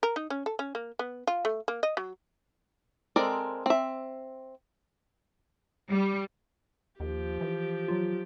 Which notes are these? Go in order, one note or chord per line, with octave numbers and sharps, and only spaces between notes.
A#4
D#4
C#4
A4
C#4
A#3
B3
F4
A3
A#3
D#5
F#3
G#3 C4 A4 A#4 D5
C4 E5
G3
D#2 F3 G4
E3
F#3 F4